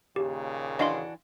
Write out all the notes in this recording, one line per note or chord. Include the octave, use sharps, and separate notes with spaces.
D#2 A#2 C#3 G4
E3 D4 F#4 D#5 F5 C6